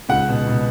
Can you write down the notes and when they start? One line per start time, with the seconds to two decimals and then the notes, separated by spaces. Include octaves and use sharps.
0.09 C#2 F#5
0.29 B2
0.47 B2